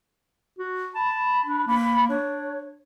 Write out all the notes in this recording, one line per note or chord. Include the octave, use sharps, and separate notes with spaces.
F#4
A5 B5
D4
A#3 B5
D4 C#5